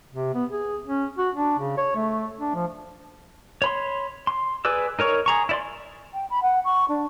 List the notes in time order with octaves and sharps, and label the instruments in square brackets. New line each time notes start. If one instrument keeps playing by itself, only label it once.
[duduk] C3
B3
G#4
C#4
F#4
D4
C#3
C#5
A3
D4
F3
[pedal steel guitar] C#5 B5 C6
C6
G#4 B4 D5 E6
D#4 A#4 C#5 C#6
G#4 A#5 C#6
E4 D5 C6
[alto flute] G5
B5
F#5
C#6
D4